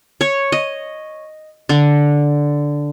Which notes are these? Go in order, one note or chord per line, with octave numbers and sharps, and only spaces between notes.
C#5
D#5
D3